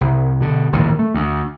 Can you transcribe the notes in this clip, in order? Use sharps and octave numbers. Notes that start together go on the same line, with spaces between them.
C2
B2 D3
A#1 D#2 A2 D#3
A3
D2